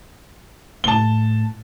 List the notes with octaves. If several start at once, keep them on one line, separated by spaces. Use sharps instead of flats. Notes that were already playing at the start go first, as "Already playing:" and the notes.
A2 A5 G7